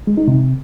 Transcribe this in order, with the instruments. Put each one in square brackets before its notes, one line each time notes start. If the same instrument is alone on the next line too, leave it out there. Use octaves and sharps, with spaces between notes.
[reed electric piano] G#3
D#4
C3